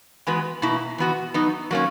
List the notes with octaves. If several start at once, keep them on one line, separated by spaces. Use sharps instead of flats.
E3 G#3 B3 F#4 B4
B2 A#3 E4
E3 B3 F#4
F#3 B3 D#4
F#3 A#3 C#4